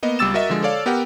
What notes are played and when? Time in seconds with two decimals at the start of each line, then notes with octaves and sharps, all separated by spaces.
0.03 A#3 B3 D#5
0.19 C#2 G3 D6 E6 A6 E7
0.34 F#4 A#4 D#5 E5
0.50 D3 F3 G#3
0.63 A4 C#5 D5 F5
0.86 B3 G4 A#4 F#5 G5